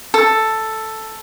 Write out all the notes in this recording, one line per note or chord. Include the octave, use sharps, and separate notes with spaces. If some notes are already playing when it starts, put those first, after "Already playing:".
A4